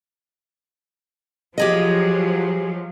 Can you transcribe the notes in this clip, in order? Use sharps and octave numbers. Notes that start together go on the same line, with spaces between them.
F3 F#3 G4 G#4 D#5